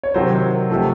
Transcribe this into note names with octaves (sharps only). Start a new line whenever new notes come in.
C#5
C3 D#3 F#3 C5
C3 F3 A3